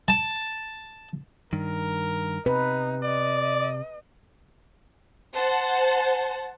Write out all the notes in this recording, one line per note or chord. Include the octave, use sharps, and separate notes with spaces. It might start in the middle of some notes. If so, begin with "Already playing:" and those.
A5
G2 D#3 A#4
C3 D#4 B4
D5 D#5
C5 F#5 A5